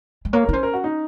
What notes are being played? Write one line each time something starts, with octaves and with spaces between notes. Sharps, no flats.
G#3
A#3 C#5
A#4
D#4
C#4 C5
A#4
F#4
D#4